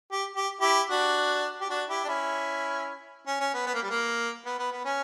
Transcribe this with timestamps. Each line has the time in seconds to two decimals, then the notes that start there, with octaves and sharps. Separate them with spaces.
0.12 G4
0.36 G4
0.61 E4 G4
0.90 D4 F#4
1.61 G4
1.69 D4 F#4
1.89 E4 G4
2.04 D4
2.08 C#4 E4
3.27 C#4
3.40 C#4
3.53 B3
3.67 B3
3.74 A#3
3.83 G3
3.90 A#3
4.45 B3
4.58 B3
4.71 B3
4.85 C#4